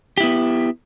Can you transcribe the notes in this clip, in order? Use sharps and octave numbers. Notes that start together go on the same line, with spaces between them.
B3 E4 G4